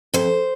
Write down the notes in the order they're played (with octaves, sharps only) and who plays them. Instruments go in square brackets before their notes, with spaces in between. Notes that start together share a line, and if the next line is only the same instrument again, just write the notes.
[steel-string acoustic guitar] F2 C5